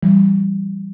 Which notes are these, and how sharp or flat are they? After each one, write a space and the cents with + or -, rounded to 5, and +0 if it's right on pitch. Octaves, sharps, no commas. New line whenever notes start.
E3 +30 G3 +0